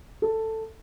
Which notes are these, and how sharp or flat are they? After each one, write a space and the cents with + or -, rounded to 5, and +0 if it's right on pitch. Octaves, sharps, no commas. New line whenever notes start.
A4 +10